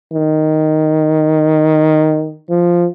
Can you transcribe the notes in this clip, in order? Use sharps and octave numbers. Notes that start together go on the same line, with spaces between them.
D#3
F3